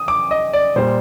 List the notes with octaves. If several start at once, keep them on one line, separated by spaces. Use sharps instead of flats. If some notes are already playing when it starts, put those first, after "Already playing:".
Already playing: D#6
D6
D#5
D5
A#2 G3 C5